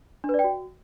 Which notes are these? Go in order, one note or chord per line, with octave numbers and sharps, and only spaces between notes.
D4
B4
D5
G5
F#4